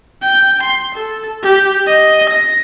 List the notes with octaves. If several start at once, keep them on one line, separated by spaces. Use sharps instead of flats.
G5
C6
A4
G4
D#5
A#6